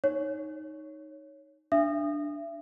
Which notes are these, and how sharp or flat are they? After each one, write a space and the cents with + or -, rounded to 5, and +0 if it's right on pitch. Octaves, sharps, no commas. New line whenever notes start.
D#4 +0 C#5 +0
D4 +0 E5 +35 D#6 -30